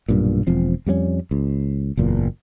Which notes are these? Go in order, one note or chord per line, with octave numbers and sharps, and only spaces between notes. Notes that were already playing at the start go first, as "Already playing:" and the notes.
B1 G2 A#2
E1 F3 C4
F2 G3 A3 C#4
C#2
F#1 E2 A#2